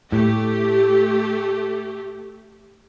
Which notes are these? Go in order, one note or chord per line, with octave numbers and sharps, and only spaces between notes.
A2 A3 G4